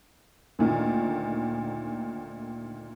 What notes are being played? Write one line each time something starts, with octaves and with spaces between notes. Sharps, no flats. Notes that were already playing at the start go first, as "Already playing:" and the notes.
D2 A#2 D#3